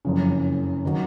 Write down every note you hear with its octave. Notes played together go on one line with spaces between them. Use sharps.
F#1 F2 C#3
D#3 F#3